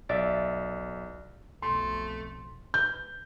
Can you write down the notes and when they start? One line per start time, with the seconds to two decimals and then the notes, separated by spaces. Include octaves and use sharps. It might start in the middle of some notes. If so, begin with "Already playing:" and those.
0.09 B1 D5 E5
1.62 B1 F2 A3 C6
2.74 G6